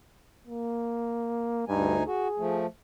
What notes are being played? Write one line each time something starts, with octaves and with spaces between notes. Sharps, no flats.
A#3
D2 G2 D#4 G#5
F#4 G#4
F3 A3